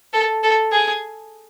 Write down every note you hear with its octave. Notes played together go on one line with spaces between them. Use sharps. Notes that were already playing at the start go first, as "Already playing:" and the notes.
A4
A4
G#4